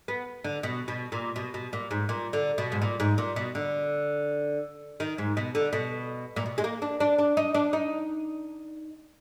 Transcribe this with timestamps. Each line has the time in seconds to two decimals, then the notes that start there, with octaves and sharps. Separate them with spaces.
0.08 B3
0.44 D3
0.63 B2
0.88 B2
1.12 A#2
1.36 B2
1.54 B2
1.73 A#2
1.91 G#2
2.09 A#2
2.33 D3
2.58 B2
2.72 G#2
2.82 A#2
3.00 G#2
3.18 A#2
3.36 B2
3.55 D3
5.00 D#3
5.18 G#2
5.37 B2
5.55 D3
5.73 B2
6.36 A#2
6.46 B2
6.58 G#3
6.64 A#3
6.82 D4
7.00 D4
7.18 D4
7.37 D#4
7.55 D4
7.73 D#4